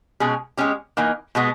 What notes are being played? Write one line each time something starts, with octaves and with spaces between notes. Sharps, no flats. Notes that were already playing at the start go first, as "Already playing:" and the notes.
B2 G#3 C#4 G#4
G#3 C#4 G4
E3 A#3 D#4
B2 G#3 B3